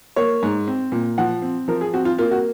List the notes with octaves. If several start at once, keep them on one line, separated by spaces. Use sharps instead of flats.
A#3 C#5
G#2
C4
A#2
F3 F#5
C4
F3 A#4
G#4
C4 F#4
F4
A#3 F4
F#4